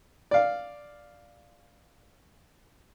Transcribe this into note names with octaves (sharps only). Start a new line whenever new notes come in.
D5 F5